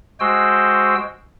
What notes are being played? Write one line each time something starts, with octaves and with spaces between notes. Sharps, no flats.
G#3 F#4 C5 G5 E6